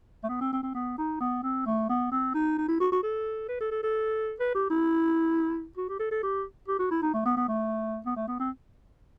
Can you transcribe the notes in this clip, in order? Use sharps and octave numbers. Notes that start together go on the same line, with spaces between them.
A3
B3
C4
C4
C4
B3
D#4
B3
C4
A3
B3
C4
D#4
D#4
E4
F#4
F#4
A4
B4
A4
A4
A4
B4
G4
E4
F#4
G4
A4
A4
G4
G4
F#4
E4
D#4
A3
B3
B3
A3
B3
A3
B3
C4